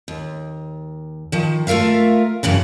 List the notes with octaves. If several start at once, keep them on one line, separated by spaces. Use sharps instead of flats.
D#2
D#3 F3
A3 F4 A#4 E5 F5
F#2 A2 C#3 E3